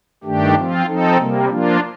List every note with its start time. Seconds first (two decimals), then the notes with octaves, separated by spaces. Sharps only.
0.24 G2 D#3 A3 D4 G4
0.56 F3 C4 F4
0.86 F3 C4 D#4 A4
1.17 C3 G3 A#3
1.48 F3 A#3 D4 F4